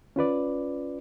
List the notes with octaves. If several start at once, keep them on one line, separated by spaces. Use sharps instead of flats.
C#4 F4 B4 D5